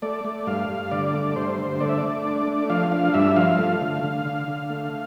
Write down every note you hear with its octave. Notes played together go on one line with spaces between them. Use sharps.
A3 D5
A3
G2 F5
G2
D3 D5
A3
G2 C5
D3
A3 D5
E5
A3 D5
D4
A3
F3 F5
D4 F5
G2 E5
F3 F5
A3
D3
D3
D3
D3
A3